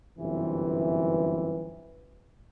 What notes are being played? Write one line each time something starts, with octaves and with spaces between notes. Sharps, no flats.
G1 F#2 C3 E3